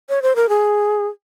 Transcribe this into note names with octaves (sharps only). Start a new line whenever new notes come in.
C#5
C5
A#4
G#4